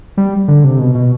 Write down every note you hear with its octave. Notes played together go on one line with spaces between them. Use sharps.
G3
D3
C3
B2
B2